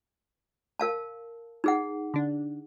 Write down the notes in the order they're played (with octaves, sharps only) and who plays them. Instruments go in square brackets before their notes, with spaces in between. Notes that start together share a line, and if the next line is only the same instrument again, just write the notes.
[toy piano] A#4 F5 A5
D#4 G#4 F#5
[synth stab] D3 D4